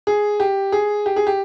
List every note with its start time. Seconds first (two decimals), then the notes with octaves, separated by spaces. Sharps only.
0.07 G#4
0.40 G4
0.72 G#4
1.06 G4
1.16 G#4
1.27 G4